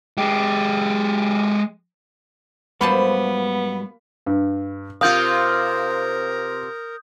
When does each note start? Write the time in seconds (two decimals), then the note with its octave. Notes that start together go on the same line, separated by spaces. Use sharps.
0.18 G#3 G4
2.81 G#2 F#3 G3 A#3 B3 C5 A5 B5
4.26 G2
5.01 C3 C4 F4 A#4 F5 D#6 G6